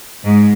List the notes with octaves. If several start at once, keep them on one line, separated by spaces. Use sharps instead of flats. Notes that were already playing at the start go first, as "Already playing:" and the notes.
G#2